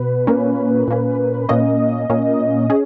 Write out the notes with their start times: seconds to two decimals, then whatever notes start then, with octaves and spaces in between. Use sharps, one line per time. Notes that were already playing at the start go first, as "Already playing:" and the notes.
Already playing: B2 B4
0.27 A#2 A#3 C#4
0.88 A#2 A#3 C#4
1.49 A#2 A#3 C#4 D#5
2.10 A#2 A#3 C#4
2.70 C#4 G#4